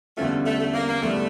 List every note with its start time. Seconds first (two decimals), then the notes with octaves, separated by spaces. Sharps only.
0.17 E2 D3 G3 A3 C#4 F4
0.46 A3
0.60 A3
0.74 A#3
0.88 A#3
1.02 E2 D3 G3 A3